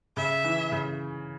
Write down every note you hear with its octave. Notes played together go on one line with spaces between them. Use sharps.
C#3 E5
E3
C#3